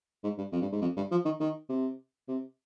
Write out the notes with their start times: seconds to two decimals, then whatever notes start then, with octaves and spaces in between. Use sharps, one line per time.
0.24 G#2
0.38 G2
0.52 F2
0.62 G2
0.72 G#2
0.82 F2
0.96 G2
1.11 F3
1.25 D#3
1.40 D#3
1.69 C3
2.28 C3